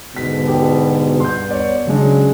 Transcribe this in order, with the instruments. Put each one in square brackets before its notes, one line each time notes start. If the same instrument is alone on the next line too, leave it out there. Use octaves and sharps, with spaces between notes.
[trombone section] G#2 B2 D3 [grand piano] B6
[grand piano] G4
[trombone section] G2 B3 [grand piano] C6 G6
[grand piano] C#5 D5
[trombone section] C#3 [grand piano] F#3 G#3 D4